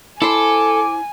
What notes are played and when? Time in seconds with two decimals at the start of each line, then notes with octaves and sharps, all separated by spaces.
0.22 E4 A4 C5 G#5 D6